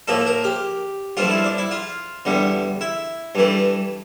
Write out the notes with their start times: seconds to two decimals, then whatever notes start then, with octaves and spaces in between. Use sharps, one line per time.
0.08 A2 F3 A#3 A4
0.26 A#4
0.44 G4
1.17 G2 F3 A3 F4
1.30 E4
1.44 D4
1.58 E4
1.71 F4
2.25 E2 D3 G3
2.81 E4
3.35 G2 E3 A3